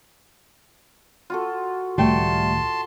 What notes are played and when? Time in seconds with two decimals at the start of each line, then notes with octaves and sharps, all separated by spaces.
1.30 F4 F#4 A4
1.98 C#2 A2 D#3 G3 A3 G5 A5 C6